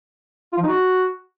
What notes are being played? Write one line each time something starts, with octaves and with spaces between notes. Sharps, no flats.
F4
F3
D#4
F#4